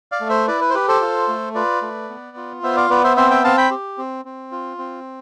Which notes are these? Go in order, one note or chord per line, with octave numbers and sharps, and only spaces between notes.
D5 F5
A3
C5 E5
E4 B4 D5
B4
C5
G4 B4
A4 C5
F4
A3
F4 B4 D5
A3
B3
F4
B3 C5 E5
D5 F5
B3 B4 D5
C5 E5
C4 C5 E5
E5 G5
C4 F5 A5
G5 B5
G4
C4
C4
F4
C4